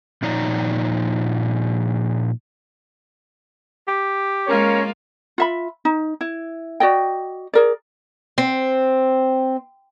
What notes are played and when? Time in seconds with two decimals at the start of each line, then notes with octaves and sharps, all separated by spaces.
0.22 A#2 F3 D#4 C#5 D5 A#5
3.88 G4
4.47 G#3 A#3 C#4 F4 A#4 C#5
5.38 F4 E5 B5
5.85 D#4
6.21 E4
6.80 F#4 D5 D#5 G5
7.53 G#4 A#4 D5
8.38 C4